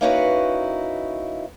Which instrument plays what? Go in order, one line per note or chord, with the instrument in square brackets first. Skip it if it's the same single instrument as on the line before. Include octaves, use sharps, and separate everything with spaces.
[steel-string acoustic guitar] A#3 C#4 D#4 E4 F#4 B4